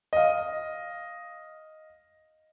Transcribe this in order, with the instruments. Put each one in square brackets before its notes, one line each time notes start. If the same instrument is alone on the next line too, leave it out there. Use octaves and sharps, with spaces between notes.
[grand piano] D#5 F5